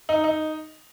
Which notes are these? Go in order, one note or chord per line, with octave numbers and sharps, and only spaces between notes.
D#4
D#4